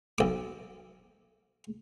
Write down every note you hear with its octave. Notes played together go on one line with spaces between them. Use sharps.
B1 D6